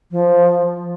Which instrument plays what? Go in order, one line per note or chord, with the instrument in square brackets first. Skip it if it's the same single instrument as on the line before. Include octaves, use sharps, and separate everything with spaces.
[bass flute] F3